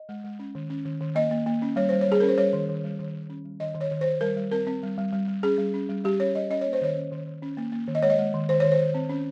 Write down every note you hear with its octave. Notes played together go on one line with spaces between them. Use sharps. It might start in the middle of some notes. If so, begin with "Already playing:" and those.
Already playing: D#5
G#3
G#3
C#4
D#3
C#4
D#3
D#3
A#3 D#5
A#3
A#3
C#4
G3 C#5
G3 C5
C#5
G3 G#4
C#4 A#4
C5
G3 C#5
D#3
D#3
G3
D#3
D#3
C#4
G3
D#3 D#5
D#3
C#5
D#3
D#3 C5
G3 A#4
G3
C4 A#4
C4
G3
G3
G3
G3
C#4 G#4
G3
C#4
G3
G3 G4
C#4 C#5
G3 D#5
C#4 D#5
A#3 C#5
C5
D#3 C#5
C#4
D#3
D#3
C#4
A#3
A#3
D#3
D#5
G#3 C#5
D#5
G#3
D#3
D#3 C5
D#3 C#5
C5
D#3
C4
C#4